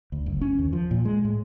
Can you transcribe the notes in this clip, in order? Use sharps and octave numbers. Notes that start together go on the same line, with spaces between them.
D2
F#1
C#4
D#2
F3
A#2
G#3
A2